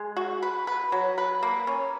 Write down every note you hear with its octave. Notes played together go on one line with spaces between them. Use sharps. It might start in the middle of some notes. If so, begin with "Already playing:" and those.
Already playing: G#3
F#4
B4
B4
F#3
B4
A#3
C#4